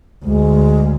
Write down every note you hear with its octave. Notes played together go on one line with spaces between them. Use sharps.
D2 G#3